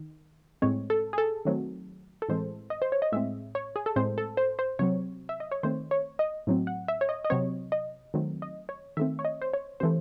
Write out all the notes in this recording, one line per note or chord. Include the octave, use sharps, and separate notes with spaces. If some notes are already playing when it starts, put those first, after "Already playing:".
Already playing: D#3
A2 G#3 C4 C#5
A4
G#4
A4
D#3 F#3 A3 C4
A4
A2 E3 G#3 C4 C5
D#5
C5
C#5
D#5
A2 G#3 C4 E5
C#5
G#4
A4
A2 G#3 C4 C5
A4
C5
C5
C3 F#3 C4 C#5
E5
D#5
C#5
D#3 A3 C4 C5
C#5
D#5
A2 F#3 C4
F#5
E5
C#5
D#5
D#5
C3 F#3 C4 C#5
D#5
D#3 F#3 A3 C4
D#5
C#5
D#3 A3 C4 E5
C#5
D#5
C5
C#5
C3 E3 A3 C5